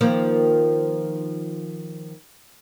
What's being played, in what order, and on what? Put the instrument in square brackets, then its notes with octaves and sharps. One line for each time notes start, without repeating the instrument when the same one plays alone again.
[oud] D#3 F3 A#3